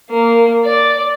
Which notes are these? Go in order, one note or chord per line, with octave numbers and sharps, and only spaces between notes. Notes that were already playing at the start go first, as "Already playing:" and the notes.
A#3
D5